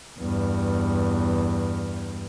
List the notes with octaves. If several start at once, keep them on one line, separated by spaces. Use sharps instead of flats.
E2 G2